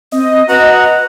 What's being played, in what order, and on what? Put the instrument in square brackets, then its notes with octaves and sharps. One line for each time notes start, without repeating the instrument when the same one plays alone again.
[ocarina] C4 [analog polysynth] D#5
[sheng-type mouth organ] F#4 F#5 A#5 [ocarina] B4